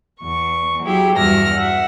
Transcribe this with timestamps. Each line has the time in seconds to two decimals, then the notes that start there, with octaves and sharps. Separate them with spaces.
0.20 E2 C#6
0.83 F#3 E4 G4 G#4
1.16 E2 G2 F#4 E5 F6 A#6
1.54 E5 F#5